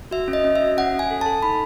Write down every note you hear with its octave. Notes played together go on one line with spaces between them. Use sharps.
F#4 E5
C#4
D#5
C#4
E5
F#4
C#4 F#5
C#4 G#5
A4
A4 A5
D#4 B5